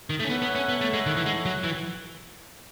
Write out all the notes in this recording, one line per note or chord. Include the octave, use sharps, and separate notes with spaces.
D#3
A3
C#4
B3 E4 A4 C#5 F#5
B3
C#4
B3
A3
G#3
D#3
E3
G#3
F#3
E3